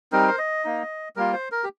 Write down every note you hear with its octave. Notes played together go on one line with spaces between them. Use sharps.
G3 C4 D#4 A#4
C5
D#5
A#3 D#4
G3 A#3 F4 A#4
C5
A#4
G4